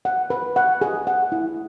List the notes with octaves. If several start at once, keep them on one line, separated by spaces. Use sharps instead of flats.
F#5
B4
F#5
G#4
F#5
E4